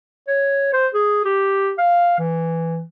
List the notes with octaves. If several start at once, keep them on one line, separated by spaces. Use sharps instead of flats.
C#5
C5
G#4
G4
F5
E3